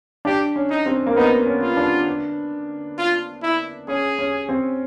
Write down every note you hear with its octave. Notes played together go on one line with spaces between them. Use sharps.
D4 G4
C#4
D#4
C4
A#3
B3 D#4
C#4
F4
D4
F4
E4
C#4 G#4
C#4
C4